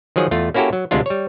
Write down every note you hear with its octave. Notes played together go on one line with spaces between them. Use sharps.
D#3 F3 F#3 G#4
E2 A3 F4
A#3 C#4 E4 F#4 G4 A4
F#3
D2 C3 G#3 D4 F4
G3 C#5